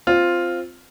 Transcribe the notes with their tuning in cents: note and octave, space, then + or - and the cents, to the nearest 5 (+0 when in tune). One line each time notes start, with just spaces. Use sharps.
C4 +0 F4 +0